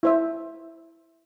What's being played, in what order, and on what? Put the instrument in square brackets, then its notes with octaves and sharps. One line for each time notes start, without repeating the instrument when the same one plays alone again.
[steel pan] E4 C5 E5